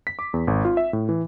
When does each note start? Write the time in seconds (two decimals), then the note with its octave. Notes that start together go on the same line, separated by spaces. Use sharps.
0.07 B6
0.19 D6
0.34 E2
0.47 G#1
0.65 F4
0.77 E5
0.93 A2
1.09 E3